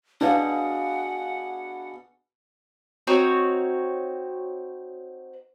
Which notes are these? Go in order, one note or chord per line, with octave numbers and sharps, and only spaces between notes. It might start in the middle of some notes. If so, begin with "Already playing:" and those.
B2 D4 G#4 B4 F5 F#5
C4 D#4 F#4 C#5